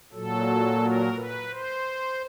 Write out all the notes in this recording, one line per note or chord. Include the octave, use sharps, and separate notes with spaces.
A#2 F#3 A4
A#4
B4
C5